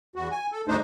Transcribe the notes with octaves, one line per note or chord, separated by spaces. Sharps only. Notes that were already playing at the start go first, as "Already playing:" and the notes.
E2 F#4
G#5
A4
D2 G#2 A3 D4 D#4 C5